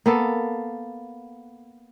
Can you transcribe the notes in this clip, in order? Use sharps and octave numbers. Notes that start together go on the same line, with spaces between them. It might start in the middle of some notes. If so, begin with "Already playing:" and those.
A#3 B3 A4